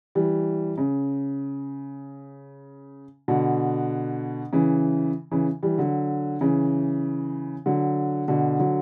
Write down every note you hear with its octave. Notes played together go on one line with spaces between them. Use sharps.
E3 G3
C#3
B2 D3
C#3 E3
C#3 E3
E3 G3
D3 F#3
C#3 E3
D3 F#3
B2 D3
D3 F#3